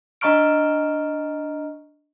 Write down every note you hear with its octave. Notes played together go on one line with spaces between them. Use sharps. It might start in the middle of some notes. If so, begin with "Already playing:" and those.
D4 D#5 A#5 C#6 F6 D7